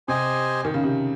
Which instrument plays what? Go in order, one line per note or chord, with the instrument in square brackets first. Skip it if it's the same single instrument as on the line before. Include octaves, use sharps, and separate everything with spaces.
[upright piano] C3 [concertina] G4 C5 D#5 G#5
[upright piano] D#3
C#3
C3